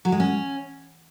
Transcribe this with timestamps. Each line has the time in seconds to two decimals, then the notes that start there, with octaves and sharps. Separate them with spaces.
0.05 F#3
0.12 G#3
0.20 C#4